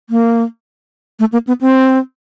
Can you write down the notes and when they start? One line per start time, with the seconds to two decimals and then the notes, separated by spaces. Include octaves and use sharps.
0.10 A#3
1.20 A3
1.32 A#3
1.47 B3
1.61 C4